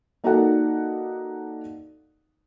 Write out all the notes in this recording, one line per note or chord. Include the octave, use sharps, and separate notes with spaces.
A#3 D#4 F#4 A4 D5 F#5